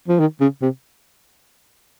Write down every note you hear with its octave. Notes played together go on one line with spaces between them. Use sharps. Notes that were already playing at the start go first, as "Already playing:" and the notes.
F3
D#3
C#3
C3